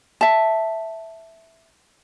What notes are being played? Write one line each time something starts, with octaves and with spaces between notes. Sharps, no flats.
E5 A5